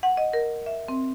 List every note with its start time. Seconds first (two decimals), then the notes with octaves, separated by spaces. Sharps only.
0.03 F#5
0.17 D#5
0.33 A#4
0.66 E5
0.88 C4